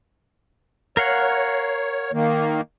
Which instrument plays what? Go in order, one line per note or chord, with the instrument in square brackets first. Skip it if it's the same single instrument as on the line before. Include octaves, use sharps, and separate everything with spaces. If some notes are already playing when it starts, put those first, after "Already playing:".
[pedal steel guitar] A#4 F5 F#5 [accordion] C#5
[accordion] D#3 A#3